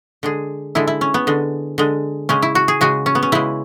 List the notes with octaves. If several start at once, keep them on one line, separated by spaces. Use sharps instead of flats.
D3 G#3 G#4
D3 G#3 E4
E4
C#4
B3
D3 G#3
D3 G#3
C#3 G#3 C#4
E4
F#4
G#4
C#3 G#3 F#4
C#4
B3
C#4
C#3 G#3 E4